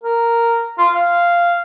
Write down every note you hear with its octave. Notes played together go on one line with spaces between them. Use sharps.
A#4
F4
F5